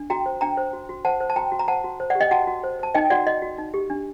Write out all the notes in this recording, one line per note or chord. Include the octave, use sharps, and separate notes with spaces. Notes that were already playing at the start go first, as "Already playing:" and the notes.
Already playing: D4
F#4 G5 A#5
C5
D4 G5 A#5
C5
F#4
F#4
C5 F#5 A5
C5
A5
F#4 G5 A#5
F#4
A#5
C5 F#5 A5
F#4
C5
D5 F#5
G4
D#5 G5
F#4 F#5 A5
F#4
C5
C5 A5
D#4 D#5 G5
F#4 D5 F#5
F#4 D#5
F#4
D#4
G4
D4